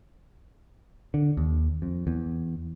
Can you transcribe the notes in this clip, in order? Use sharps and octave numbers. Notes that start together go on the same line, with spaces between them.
D3
D#2
F2
E2